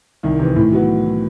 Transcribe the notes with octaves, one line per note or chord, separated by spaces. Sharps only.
C2 D#3
C3 E3
A2 E3
F#3 B3 F#4